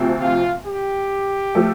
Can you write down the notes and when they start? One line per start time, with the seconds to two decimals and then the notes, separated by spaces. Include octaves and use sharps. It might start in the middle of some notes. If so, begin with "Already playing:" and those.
Already playing: D2 C3 F3 C4
0.20 F4
0.65 G4
1.55 F3 A3